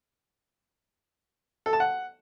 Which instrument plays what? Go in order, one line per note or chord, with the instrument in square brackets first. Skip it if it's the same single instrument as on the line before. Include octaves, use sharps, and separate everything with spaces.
[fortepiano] A4
A5
F#5